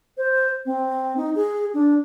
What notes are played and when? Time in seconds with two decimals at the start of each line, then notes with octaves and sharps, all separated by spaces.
0.18 C5
0.66 C4
1.17 D#4
1.35 G#4
1.74 D4